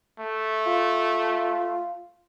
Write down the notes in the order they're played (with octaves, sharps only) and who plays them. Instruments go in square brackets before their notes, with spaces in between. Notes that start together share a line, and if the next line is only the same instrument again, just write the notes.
[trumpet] A3
[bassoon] F4